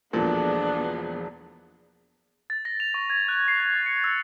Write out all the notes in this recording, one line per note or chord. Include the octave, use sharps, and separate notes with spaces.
E1 A#1 A#2 B3 D4 G#4 A4
A6
A#6
F7
C#6
G#6
F#6
C7
G#6
A6
C#7
E6